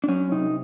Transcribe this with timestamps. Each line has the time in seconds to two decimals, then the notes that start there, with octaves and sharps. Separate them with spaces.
0.04 D4
0.08 F#3 C#4
0.31 C3 D#4